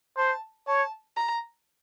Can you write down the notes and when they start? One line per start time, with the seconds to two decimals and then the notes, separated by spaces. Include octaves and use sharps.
0.17 C5 A5
0.67 C#5 A5
1.16 A#5